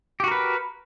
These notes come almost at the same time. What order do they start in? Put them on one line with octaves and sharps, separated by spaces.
G4 F#4 A#4 B4